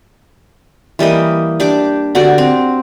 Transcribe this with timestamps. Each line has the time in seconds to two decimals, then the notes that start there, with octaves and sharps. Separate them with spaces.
0.99 E3 G3 A#3 D#5
1.60 D4 G4 D6
2.15 D3 F#4 G4 D5
2.38 C4